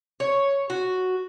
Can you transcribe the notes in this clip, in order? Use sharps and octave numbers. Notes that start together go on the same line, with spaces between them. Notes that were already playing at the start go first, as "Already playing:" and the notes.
C#5
F#4